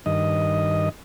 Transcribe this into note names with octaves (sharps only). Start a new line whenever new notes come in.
G2 D#3 D#5